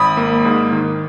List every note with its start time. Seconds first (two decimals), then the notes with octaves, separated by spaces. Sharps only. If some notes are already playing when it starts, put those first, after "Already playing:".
Already playing: G#1 B5 D#6
0.17 A#3
0.45 G#2
0.72 D#3